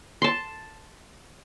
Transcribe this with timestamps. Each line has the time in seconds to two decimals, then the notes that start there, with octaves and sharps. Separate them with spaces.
0.22 A5 C6